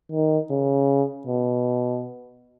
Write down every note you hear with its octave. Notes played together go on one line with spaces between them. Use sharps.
D#3
C#3
B2